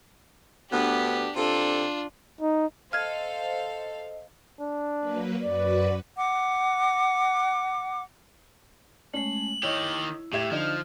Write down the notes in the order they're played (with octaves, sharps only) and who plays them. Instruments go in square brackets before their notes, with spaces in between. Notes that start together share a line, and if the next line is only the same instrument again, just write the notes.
[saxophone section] D2 B3 [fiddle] D4 G4
[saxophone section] C3 A4 [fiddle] D4 F4
[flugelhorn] D#4
[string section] A4 C5 F5 [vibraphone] D#5 [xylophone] F6 G#6
[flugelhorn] D4
[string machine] F#3 A#3 B4
[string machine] F#2 F#4 B4 [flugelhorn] D5
[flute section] F#5 D6
[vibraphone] G#3 A3 [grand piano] C#4 [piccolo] F#7
[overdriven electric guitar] D#3 G4 [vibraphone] E4 [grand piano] C#5 D#5
[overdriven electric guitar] A2 [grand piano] G4 E5 G#6
[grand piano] D3 D#4 [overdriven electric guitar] F3 [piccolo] F6